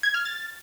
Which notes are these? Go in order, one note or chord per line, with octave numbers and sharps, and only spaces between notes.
G#6
F6
A6